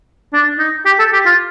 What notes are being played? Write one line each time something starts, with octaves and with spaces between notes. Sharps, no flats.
D4
D#4
G4
A4
G4
F4